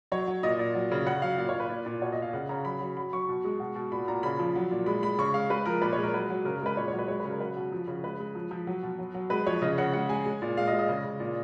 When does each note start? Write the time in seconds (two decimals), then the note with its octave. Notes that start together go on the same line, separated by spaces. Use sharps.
0.12 F#3 C#5
0.27 F#3
0.43 A#2 D#5
0.59 A#2
0.75 F#3
0.91 C#3
1.06 C#3 F#5
1.22 F#3 F5
1.38 A#2 F5
1.49 C#5
1.54 A#2
1.60 B4
1.69 A#2
1.86 A#2
2.02 B2 C#5
2.12 B2 D#5
2.22 F5
2.33 C#3 F#5
2.49 C#3 A#5
2.65 F#3 B5
2.80 F#3
2.97 F#3 B5
3.13 F#3 C#6
3.29 B2
3.44 G#3
3.60 B2
3.76 B2
3.92 A#2 B5
4.08 A#2 A#5
4.23 C#3 B5
4.39 F3
4.55 F#3
4.71 A#2
4.86 G#3 B5
5.02 G#3 B5
5.19 C#3 C#6
5.34 G#3 F5
5.50 G#3 B4
5.66 F3 A#4
5.82 A#2 B4
5.93 G#3 C#5
6.03 A#4
6.13 F#3 B4
6.30 F#3
6.45 C#3 A#4
6.56 A#4
6.62 G#3 B4
6.77 A#2 C#5
6.88 F#3 C#5
6.98 B4
7.08 G#3 C#5
7.20 C#3 B4
7.30 A#4
7.40 F#3 B4
7.56 B2
7.72 F3
7.88 C#3
8.04 G#3 B4
8.20 G#3
8.35 F3
8.51 F3
8.67 F#3
8.83 B2
8.99 F#3
9.14 F#3
9.30 G#3 B4
9.47 F3 C#5
9.62 C#3 D#5
9.78 C#3 F#5
9.93 G#3 F#5
10.09 G#3 G#5
10.26 G#3
10.42 A#2
10.57 G#3 F5
10.67 D#5
10.73 G#3
10.79 D#5
10.89 C#3
11.04 C#3
11.20 A#2